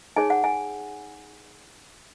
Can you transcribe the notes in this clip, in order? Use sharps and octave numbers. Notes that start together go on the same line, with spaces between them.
D#4 G#4 C#5 G#5
F#5
G#5